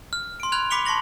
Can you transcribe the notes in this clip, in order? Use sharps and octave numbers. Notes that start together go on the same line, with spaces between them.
F6
C6 D7
B5 F6 F#6 G#6 F7
B5 D6 B6 C#7 F7 G7
A5 C6 C#6 A#6 F#7